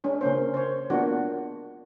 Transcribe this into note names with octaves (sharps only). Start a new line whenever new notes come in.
G#3 C#4 D4
C#3 A#3 C#4 C5
C5 C#5
G#3 A#3 B3 D4 F4 F#4